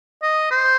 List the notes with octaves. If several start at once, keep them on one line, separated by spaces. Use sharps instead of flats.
D#5
C5